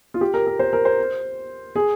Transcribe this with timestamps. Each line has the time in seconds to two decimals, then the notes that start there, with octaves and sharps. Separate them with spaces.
0.14 F4
0.21 G4
0.34 A#4
0.47 A#4
0.59 C5
0.73 A#4
0.85 C5
1.75 G#4